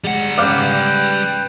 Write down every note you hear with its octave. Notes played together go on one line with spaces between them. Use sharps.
G3 G#3 F#5
G#2 C#3 B4 D5 F5 G5